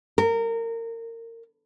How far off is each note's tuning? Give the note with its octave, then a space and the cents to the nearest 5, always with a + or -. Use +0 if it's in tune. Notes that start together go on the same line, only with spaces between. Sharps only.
A#4 -25